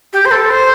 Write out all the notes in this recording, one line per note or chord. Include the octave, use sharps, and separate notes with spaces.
G4
C5
A4
C5